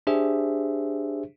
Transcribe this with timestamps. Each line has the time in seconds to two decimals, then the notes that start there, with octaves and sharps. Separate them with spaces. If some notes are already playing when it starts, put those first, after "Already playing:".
0.07 D4 G4 G#4 C5 E5